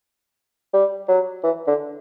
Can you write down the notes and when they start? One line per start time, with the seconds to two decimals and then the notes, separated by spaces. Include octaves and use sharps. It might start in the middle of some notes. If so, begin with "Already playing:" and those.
0.74 G3
1.08 F#3
1.44 E3
1.67 D3